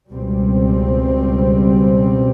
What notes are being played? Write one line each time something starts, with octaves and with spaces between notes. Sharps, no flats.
C#2 B2 G3 C4